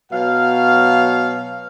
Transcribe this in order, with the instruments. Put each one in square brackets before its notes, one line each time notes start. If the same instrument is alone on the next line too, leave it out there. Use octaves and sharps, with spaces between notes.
[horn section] B2 F#3 F5